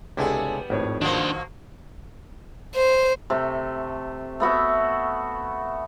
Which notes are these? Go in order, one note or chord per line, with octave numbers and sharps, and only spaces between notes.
C#2 C3 G3 B3 D4 E4 G#4 A4
G#1 F2 A2 C#5
D#3 F3 F#3 A#3 D4 C5
C5
C3 A3
A3 B3 F#4 E5